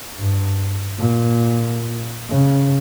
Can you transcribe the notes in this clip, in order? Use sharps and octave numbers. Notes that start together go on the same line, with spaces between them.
G2
A#2
C#3